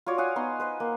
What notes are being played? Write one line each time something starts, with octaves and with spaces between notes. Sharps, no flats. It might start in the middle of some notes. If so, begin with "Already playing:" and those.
F4 F#4 C#5 D5
F5 F#5 G#5 D#6
B3 D#4 C6
B4 C5 D#5
A#3